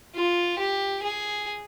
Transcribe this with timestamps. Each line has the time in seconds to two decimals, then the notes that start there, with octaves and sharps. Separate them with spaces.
0.15 F4
0.58 G4
1.02 G#4